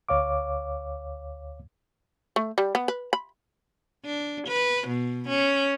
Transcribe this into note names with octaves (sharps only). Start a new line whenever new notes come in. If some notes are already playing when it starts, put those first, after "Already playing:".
D2 C#5 F5 D6
A3
G3
B3
B4
B5
D4
B4
B2
C#4